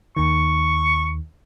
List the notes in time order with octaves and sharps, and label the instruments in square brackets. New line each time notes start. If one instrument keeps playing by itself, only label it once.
[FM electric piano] D#2 D#3 [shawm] C#6